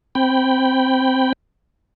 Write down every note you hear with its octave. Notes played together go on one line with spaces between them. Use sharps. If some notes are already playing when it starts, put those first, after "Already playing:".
C4 G5 B5